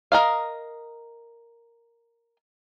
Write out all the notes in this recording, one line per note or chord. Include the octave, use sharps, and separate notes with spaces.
A#4 D#5 F5